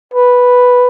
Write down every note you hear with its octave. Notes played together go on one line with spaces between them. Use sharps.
B4